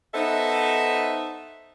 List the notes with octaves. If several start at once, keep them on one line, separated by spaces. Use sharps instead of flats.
B3 D#4 A4 C5 D#5 E5